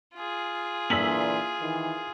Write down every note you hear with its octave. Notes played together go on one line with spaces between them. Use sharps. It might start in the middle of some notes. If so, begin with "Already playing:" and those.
F4 G#4
A#2 D3 E3 E6 B6 F#7
D#3 E3